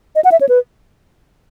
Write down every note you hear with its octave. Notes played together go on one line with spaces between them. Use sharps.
D#5
F#5
E5
C#5
B4